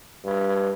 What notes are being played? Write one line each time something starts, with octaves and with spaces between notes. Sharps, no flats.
G2